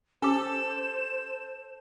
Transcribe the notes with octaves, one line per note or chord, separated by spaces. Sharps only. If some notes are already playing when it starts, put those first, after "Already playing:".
C#4 G4 A4 C5 E7